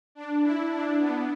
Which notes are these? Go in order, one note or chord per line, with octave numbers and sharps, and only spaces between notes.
D4
E4
D4
B3